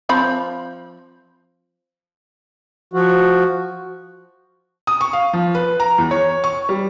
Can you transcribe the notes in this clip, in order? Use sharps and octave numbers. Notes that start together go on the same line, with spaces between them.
F3 C4 B5
F3 F#4
D#6
C#6
F5
F3
B4
A#5
E2
C#5
C#6
G3